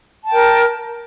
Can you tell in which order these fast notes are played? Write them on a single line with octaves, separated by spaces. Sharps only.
A5 G5 A#4